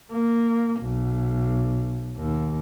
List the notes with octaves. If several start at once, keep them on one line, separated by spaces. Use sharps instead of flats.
A#3
B1
D#2